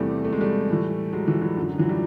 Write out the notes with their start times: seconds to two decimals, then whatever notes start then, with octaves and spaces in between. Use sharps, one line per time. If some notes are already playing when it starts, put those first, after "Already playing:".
Already playing: E2 C3 E3 G3 A3
0.25 A3
0.33 G#3
0.41 G3 A3
0.70 A2 E3
1.13 F#3 G#3
1.27 E3 F#3
1.42 E3 F#3
1.56 F#2 D3 F3
1.67 F3
1.78 E3 F#3
1.89 F3 G3